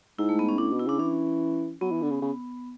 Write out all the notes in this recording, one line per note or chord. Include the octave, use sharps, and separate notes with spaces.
G#2 E4
A3
B3
C#4
A2 D4
B2
E4
C#3 D4
E3 C#4
F#3 B3
E3
D3
C#3
C#3